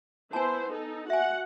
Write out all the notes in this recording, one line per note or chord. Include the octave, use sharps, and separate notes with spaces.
B3 E4 C5 G#5 A5
D#4 A4
F#4 E5 F#5 G#5